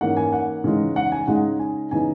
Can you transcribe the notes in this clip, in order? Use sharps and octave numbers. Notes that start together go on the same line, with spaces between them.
G#2 E3 A#3 C#4 F#5
G#5
F#5
C#3 E3 G#3 D#4
F#5
G#5
C#3 G#3 D#4 F#5
G#5
C#3 E3 B3 D#4 G#5